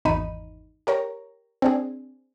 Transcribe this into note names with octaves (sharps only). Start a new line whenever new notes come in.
G#1 E2 D#4 B5 D#7
G4 A#4 C#5 A#5
C4 D4 G#4